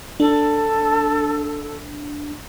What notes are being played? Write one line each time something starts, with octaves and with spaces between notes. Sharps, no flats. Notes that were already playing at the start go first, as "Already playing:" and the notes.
D4 A4